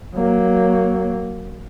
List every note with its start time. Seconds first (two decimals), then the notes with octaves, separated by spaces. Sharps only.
0.15 F#3 A#3